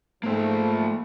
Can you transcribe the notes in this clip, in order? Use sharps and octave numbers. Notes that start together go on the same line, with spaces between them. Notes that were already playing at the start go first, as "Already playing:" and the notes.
G#2 F3 A3 A#3 C5